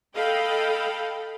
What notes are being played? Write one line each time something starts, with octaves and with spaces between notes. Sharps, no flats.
A4 D#5 F5 G5 B5